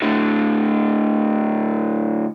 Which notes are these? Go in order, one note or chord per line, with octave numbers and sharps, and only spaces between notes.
A2 D3